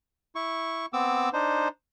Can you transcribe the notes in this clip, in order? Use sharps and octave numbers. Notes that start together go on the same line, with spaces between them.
E4 C#6
B3 C4 D6 E6
D4 D#4 C5